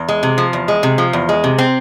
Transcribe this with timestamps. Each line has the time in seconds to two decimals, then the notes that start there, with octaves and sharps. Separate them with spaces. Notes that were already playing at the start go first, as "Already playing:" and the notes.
Already playing: E2
0.08 G#3
0.23 C3
0.38 F3
0.53 E2
0.68 G#3
0.83 C3
0.98 F3
1.13 E2
1.29 G#3
1.44 C3
1.58 C4